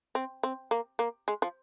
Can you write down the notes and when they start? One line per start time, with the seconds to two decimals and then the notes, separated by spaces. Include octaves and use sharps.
0.15 C4
0.43 C4
0.71 A#3
0.99 A#3
1.28 G#3
1.42 F3